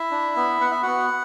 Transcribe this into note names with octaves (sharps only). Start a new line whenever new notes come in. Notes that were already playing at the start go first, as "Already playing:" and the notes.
Already playing: E4 E5
D4
B3
B3 F#5
E5
B3 F#4 F#5